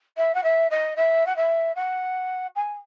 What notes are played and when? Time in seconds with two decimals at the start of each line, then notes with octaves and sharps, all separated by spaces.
0.17 E5
0.34 F#5
0.43 E5
0.70 D#5
0.96 E5
1.26 F#5
1.36 E5
1.75 F#5
2.55 G#5